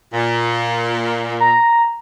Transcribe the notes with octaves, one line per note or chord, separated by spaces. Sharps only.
A#2
A#5